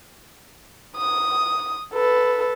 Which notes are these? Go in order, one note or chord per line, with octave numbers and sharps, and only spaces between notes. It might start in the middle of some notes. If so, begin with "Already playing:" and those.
D#6
A4 B4